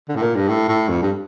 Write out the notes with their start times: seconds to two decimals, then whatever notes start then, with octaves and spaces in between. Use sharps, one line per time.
0.09 D3
0.16 A2
0.22 A#2
0.35 G2
0.48 A2
0.68 A2
0.89 F2
1.02 G2